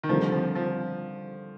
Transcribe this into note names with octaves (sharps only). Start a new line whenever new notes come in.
D#3
D3 F3 G3 C4
F3
F3